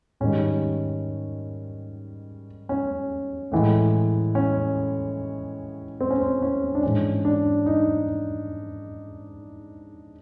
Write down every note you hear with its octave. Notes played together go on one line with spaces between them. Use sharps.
G#2 D#3 G3 C#4
C#4
A2 E3 G#3
C#4
C4
C#4
C4
C#4
D4
G#2 E3 G#3 C#4
D4
D#4